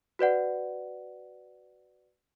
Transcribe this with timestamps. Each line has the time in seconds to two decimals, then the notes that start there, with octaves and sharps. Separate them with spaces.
0.19 F#4 B4 D5 F#5